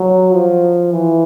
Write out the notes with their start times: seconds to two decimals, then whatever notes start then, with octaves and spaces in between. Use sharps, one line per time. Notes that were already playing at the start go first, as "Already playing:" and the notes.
Already playing: F#3
0.33 F3
0.92 E3